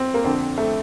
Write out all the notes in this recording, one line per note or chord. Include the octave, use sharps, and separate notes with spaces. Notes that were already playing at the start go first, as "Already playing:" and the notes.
Already playing: C4
A#3
F2 D3 C4
A3